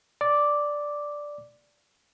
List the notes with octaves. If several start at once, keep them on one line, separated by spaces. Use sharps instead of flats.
D5 D6